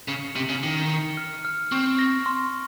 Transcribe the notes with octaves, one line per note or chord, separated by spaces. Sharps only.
C#3 C#7
C3 F#7
C#3
D#3 C#7
C#7
F6
F6
C4 C#6
A#6
C6